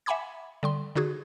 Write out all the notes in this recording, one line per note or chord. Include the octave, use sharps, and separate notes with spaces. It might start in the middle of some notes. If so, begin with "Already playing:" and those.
E5 F#5 G#5 B5 D6 G#6
D3 G3 C6
D3 D#4 F#4 G#4